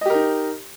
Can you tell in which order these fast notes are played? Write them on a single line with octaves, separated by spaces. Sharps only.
D#5 G4 A#4 D#4